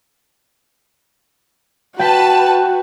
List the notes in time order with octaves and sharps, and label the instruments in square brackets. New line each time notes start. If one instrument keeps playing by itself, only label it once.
[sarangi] F#4 [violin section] B4 A5 [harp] G5 B6